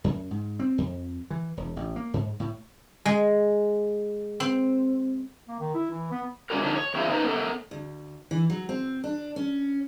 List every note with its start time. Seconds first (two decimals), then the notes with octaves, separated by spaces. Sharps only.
0.04 F#2
0.31 G#2
0.60 C4
0.78 F2
1.30 E3
1.57 E1
1.76 A1
1.96 A#3
2.14 G#2
2.40 A2
3.05 G#3
4.40 C4
5.48 A#3
5.59 D#3
5.74 E4
5.90 E3
6.11 B3
6.50 C3 G#3 D4 F#4 A#4
6.63 D3 F3 D4 D#4
6.75 C#5
6.94 E2 C4 E4 F4 G#4
7.09 D#4 B4 C5 D#5
7.24 B3 A4 A#4
7.71 D2
8.31 E3
8.50 F#3
8.69 C4
9.04 D4
9.36 C#4